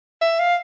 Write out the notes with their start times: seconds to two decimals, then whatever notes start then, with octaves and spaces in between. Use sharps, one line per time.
0.22 E5
0.39 F5